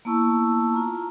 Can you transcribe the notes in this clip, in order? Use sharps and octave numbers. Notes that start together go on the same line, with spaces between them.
A#3 B3 E4 A5 C#6 E6
F4 A#5